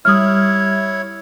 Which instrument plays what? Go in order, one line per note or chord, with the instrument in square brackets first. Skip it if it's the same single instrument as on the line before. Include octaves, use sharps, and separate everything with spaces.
[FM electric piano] G3 E5 [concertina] E4 C#5 [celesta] D#6 F6